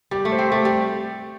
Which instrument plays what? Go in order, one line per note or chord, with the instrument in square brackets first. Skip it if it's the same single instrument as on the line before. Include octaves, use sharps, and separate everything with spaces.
[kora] G3 [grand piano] G4
[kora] A3
[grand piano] C5
[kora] C4
[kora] A3 [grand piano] G4
[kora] G3